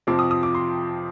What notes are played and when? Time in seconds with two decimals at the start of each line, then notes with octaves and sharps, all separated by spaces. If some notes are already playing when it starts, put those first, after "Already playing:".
0.07 F2 C3 F3 C4 D6
0.19 D#6
0.31 D#6
0.43 D6
0.55 C6